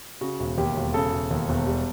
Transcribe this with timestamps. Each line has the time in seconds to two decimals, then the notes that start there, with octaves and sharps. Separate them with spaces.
0.21 C#3 F#4
0.40 E1
0.58 D#2 G4
0.76 E1
0.94 C#3 A4
1.12 E1
1.31 D#2
1.49 E1
1.66 G3